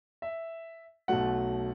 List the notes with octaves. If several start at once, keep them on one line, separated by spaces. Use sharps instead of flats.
E5
B1 B2 F#3 A3 F#5